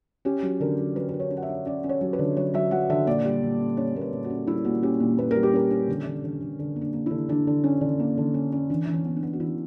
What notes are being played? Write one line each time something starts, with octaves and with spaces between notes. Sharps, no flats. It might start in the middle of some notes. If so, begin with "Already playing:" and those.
C#4 G4
F#3
D3 A#4
F#3
F#3 B4
C#4 B4
C#5
C#4
F#5
E5
C#4
C#4 D5
C#4
C#5
F#3
B4
D3
F#3 C#5
F#3 E5
F#3 F#5
D3 E5
A#2 D5
G3
A#2
C#4
C#4 C#5
A#2 A#4
B4
A#2
F#4
C#4
G3 E4
A#2 F#4
C#4 G4
A#2
A#2 B4
G3 A#4
G4
C#4 A#4
C#4
D3
D3
D3
D3
D3
A#3
D4
A#3
E4
D3
D3 D4
D3
C#4
D3
A#3
D3
C#4
C#4
E3 D4
E3
C#4
B3
D4
B3
F#4
E3 E4